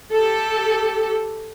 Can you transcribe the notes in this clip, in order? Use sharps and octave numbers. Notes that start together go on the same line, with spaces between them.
G4 A4